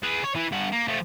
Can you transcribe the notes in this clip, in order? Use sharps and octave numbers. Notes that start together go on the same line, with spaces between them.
G#4 B4
C#5
E3
G2 F#5
A#3
F3 A3